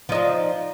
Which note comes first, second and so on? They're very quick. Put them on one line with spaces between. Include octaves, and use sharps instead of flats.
F3 D#4 D4